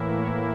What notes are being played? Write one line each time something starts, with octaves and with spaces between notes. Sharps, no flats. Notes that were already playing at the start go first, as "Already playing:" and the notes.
Already playing: A2 E3 A#3 E4
C#5